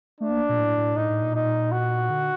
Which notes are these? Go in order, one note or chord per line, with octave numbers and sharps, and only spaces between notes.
A3 D4
A#3
A#2
A2
A2
A2 D#4
A2
A#2
D#4
F#4
D3